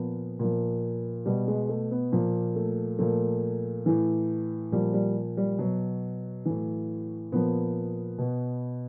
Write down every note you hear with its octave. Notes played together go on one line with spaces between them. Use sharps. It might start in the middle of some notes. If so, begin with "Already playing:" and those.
Already playing: A#2 F3 B3
A#2 F3
B2 G3
G#3
A3
B3
A#2 F3 A#3
A3
A#2 F3 A3
A2 E3
A#2 F3 G3
G3
G3
B2 F#3
A2 E3
A#2 F3 B3
B2